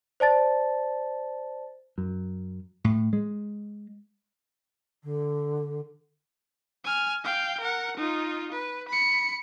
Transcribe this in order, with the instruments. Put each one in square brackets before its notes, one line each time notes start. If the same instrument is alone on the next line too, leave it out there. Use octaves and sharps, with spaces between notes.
[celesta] C5 D5 A5 A6
[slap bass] F#2
A2
G#3
[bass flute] D3
[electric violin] G#5 F6
F5 G5
A#4 F#5
D#4 F4
B4
B5 C#7